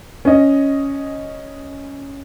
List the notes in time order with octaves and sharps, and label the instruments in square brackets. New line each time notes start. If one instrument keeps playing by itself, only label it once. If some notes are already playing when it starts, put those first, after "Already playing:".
[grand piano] C#4 D#5